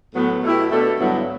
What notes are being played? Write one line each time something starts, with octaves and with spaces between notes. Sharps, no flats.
A2 F#3 B3
B2 A3 E4 G4
B2 A3 D4 A4
G2 D3 F#3 B3 E4